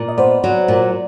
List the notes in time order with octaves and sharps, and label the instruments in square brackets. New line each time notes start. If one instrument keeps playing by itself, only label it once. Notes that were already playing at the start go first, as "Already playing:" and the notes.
Already playing: [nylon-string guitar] A#2
[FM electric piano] D#5
[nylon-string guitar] B3 [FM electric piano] C5 D5
[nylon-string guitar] F#3
A#2